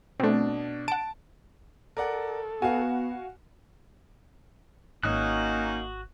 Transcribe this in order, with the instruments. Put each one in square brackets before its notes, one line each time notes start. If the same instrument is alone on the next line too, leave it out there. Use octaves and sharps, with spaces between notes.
[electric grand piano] B2 D4 [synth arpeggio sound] A3 C4
[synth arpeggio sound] F#5 D7 [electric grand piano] A5
[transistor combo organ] A4 [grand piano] A#4 D5 F#5
[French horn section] B3 [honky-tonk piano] F#4 [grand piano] F5 G#5
[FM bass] G#1 [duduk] A#3 [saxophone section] C#4 D#4 [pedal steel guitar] F#4 D#6 F#6